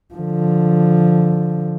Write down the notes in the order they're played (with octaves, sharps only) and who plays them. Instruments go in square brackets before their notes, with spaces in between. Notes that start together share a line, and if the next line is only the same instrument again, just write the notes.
[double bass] D3 F3